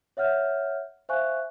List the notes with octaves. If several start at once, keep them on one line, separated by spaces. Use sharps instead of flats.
C#5 E5 F#5 F6 G6
C5 E5 F5 G#5 C#6 F#6